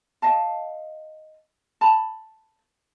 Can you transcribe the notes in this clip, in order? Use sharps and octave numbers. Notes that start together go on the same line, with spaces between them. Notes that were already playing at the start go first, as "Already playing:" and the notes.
D#5 F5 A5
A5 B5